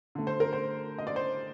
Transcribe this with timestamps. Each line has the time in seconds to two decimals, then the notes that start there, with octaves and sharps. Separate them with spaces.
0.15 D3 A3
0.27 C5
0.40 A#4
0.53 C5
0.98 D#5
1.07 D5
1.16 C5